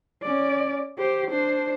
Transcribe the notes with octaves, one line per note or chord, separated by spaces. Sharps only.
C#4 D5
G4 C5
D4 C5